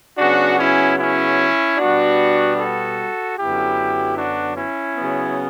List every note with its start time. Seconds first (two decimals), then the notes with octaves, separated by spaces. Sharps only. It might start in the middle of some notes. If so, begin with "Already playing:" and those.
0.18 C#3 F#3 B3 D4 F#4
0.58 C#4 E4
0.98 C#4 E4
1.77 B2 G3 B3 D4 F#4
2.57 F#4 A4
3.37 F#2 D3 F#3 B3 E4 G4
4.17 D4 F#4
4.56 C#4 E4
4.97 C#3 F#3 B3